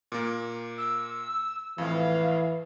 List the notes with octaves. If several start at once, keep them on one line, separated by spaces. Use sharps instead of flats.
A#2 A#3
E6
F2 A2 E3 F5